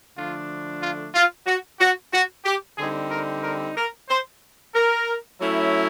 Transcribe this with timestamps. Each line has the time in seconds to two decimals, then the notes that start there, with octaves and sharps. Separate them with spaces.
0.16 D3 F3 A3 D4 F4
0.82 F4
1.14 F4
1.47 F#4
1.80 F#4
2.13 F#4
2.45 G4
2.78 D3 G3 C4 D#4 G#4
3.11 A#4
3.43 A#4
3.77 A#4
4.09 C5
4.75 A#4
5.40 F#3 A3 C#4 E4